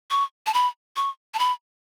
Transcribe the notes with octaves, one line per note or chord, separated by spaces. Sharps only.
C#6
A5
B5
C#6
A5
B5